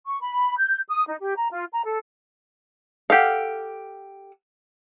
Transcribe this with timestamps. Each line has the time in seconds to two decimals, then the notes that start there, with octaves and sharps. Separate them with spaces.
0.06 C#6
0.21 B5
0.57 G6
0.88 D#6
1.06 D#4
1.21 G4
1.35 A#5
1.51 F4
1.72 A#5
1.85 A4
3.10 G4 A4 F5 F#5